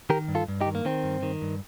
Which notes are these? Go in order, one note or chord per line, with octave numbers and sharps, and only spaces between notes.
D#3 G4 A#4
G2
F4 A4
G2
D#4 G4
D#3
A#3
D#3 C4
G2
D#3
G2